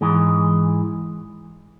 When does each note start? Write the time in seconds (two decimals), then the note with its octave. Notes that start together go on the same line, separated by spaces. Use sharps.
0.01 G#2 E3 G#3